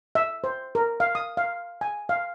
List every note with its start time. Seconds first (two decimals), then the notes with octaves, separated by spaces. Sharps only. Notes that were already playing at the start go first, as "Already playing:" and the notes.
0.15 E5
0.44 C5
0.75 A#4
1.00 F5
1.15 D#6
1.37 F5
1.81 G#5
2.09 F5